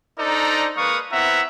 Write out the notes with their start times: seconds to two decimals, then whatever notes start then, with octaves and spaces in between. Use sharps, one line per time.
0.19 D4 D#4 A4 C5 D5 A#5
0.76 G#3 A#3 B4 F5 C#6 D#6
1.11 B3 C4 E4 E5 F#5 A#5